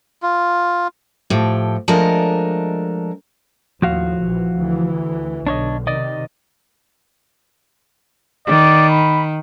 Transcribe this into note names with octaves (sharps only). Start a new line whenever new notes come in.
F4
A2 F3 G4
F3 G#3 A3 D4 A#4 D#5
D#2 A2 F3 F#4 F5
A#1 E3
D2 E3
B1 D3 D4 C#5 D#5
C3 D#3 D5 D#5
D#3 D5
B5